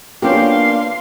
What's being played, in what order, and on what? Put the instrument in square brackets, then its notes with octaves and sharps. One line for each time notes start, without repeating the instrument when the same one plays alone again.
[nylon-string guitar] A#3 B3 D4 [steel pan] C#4 F4 G4 [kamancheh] F5 C6